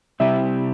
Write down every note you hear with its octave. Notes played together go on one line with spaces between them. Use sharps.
C3 G3 C4 E4 G4 E5